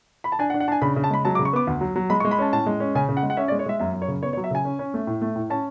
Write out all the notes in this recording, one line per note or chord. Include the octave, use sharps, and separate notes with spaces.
B5
A5
D4 G#5
F#5
D4
F#5
D4 G#5 A5
C#3 B5
C#3
A5
G#3 B5
F#3 A5
D6
C#3
C#6
B3 D6
D2
F#3
F#3
G#3 B5
C#6
G#3
B5
C#4 A5
A2 A5
G#3
C#4
C#3 G#5
C#3
F#5
G#3
F#5
C#4 E5
D5
G#3
C#5
G#3 E5
F#2 E5
F#2
C#5
C#3
B3 C#5
C#5
F#3
E5
C#3 G#5
C#4
C#4
A3
A2
A3
A2
C#4 A5